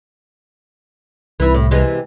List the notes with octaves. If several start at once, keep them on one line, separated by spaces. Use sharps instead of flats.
C2 E3 E4
A2
C3 E3 G#3